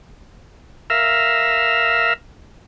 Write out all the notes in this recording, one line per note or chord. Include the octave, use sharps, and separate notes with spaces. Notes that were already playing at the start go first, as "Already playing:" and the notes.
A#4 E5 F5